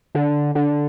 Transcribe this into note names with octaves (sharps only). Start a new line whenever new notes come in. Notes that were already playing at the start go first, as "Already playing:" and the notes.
D3
D3